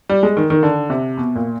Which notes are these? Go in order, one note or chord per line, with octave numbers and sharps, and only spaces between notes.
G3
G#3
D#3
D#3
D3
C3
B2
A#2